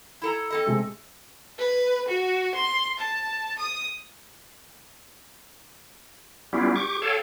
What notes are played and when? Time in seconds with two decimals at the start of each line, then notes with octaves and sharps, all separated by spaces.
0.22 E4 A4 A#5
0.50 C4 A4 D#5
0.66 C3 G#3 A3
1.59 B4
2.08 F#4
2.55 C6
2.99 A5
3.59 D#6
6.53 G3 B3 C#4 E4 F4 G4
6.76 G4 C#6 D6
7.02 A4 C#5 F5 G5 A5